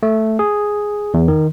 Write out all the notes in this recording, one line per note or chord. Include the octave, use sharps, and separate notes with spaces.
A3
G#4
E2
D#3